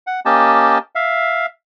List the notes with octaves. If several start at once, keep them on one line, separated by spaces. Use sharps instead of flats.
F#5
A#3 C#4 G4 D#5 G5 A5
E5 F5